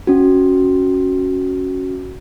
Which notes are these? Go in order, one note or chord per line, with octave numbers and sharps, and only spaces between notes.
C#4 F#4